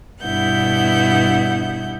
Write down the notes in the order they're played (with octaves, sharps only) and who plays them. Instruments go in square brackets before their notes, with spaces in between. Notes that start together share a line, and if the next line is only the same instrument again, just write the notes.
[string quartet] G2 B2 B3 E4 F#5 G6